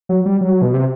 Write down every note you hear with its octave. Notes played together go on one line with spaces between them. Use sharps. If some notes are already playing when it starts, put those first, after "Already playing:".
F#3
G3
F#3
B2
C3